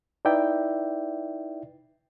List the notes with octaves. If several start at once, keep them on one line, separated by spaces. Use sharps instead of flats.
D#4 E4 B4 D5 E5 G5